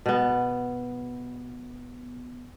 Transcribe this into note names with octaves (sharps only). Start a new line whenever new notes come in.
B2 B3